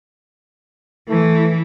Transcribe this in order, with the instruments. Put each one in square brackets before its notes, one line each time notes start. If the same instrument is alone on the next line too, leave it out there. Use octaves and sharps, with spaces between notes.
[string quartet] E3 [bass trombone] A3